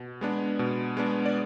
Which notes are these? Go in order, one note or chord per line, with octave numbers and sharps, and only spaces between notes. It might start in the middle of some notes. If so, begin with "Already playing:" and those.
Already playing: B2
G#3 B3 D4
B2
G#3 B3 D4
D5